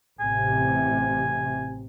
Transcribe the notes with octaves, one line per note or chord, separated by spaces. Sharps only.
A1 C3 G#5